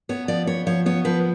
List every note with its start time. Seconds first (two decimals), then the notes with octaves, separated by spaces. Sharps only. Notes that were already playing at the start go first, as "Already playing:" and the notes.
0.09 B3 C#5
0.28 F3 D5
0.47 B3 C#5
0.66 F3 C#5
0.86 B3 C#5
1.05 F3 B4